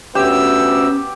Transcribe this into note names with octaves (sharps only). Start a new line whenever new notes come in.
D2 B3 C#4 G4 E6